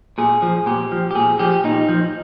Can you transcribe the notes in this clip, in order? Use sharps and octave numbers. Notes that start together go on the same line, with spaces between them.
A#2 G#4
F3
A#2 G4
F3
G4
A#2 G#4
F3 G4
A#2 D#4
F3